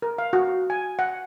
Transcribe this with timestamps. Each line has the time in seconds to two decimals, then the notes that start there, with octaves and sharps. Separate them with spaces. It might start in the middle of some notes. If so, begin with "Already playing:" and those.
0.02 A#4
0.18 F5
0.33 F#4
0.70 G#5
0.99 F#5